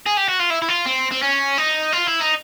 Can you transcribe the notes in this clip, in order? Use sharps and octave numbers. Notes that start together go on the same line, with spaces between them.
G#4
G4
F#4
F4
E4
E4
F4
C4
C4
C#4
D#4
F4
E4
D#4